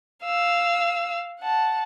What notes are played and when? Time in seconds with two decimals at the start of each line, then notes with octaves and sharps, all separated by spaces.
0.25 F5 E6
1.40 F#5 A5